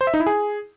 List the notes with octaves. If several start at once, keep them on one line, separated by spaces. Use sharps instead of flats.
C5
E5
D#4
E4
G#4